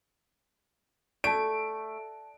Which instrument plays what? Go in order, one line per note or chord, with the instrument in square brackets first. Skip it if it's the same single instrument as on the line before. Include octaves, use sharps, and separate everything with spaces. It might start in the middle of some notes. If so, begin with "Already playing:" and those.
[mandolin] A3 [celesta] D5 A5 [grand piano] D7